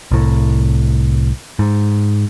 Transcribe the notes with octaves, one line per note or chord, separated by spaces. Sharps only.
C2 A2
G#2